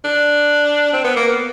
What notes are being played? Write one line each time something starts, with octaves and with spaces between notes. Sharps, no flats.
D4
C4
B3
A#3
B3